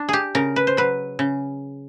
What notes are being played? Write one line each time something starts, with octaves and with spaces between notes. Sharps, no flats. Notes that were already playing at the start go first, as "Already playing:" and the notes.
Already playing: D4
G4 G#4
C#3 A#4
B4
C5
F#3 B4
C#3